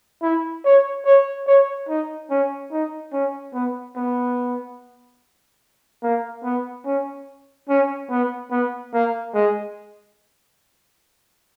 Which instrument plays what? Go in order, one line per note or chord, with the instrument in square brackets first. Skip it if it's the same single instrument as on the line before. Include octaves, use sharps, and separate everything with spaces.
[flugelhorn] E4
C#5
C#5
C#5
D#4
C#4
D#4
C#4
B3
B3
A#3
B3
C#4
C#4
B3
B3
A#3
G#3